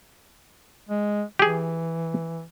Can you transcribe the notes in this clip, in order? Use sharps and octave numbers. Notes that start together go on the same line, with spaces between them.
G#3
E3 G4 G#4